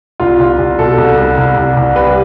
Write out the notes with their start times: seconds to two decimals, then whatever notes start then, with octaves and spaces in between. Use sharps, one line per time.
0.20 C2 F4
0.39 C2
0.58 C2
0.79 B2 A4
0.98 C2
1.18 C2
1.37 C2
1.57 C2
1.77 C2
1.96 G3 B4